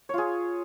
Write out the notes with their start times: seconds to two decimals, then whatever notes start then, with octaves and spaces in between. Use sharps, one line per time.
0.09 C#5
0.14 F4
0.18 G#4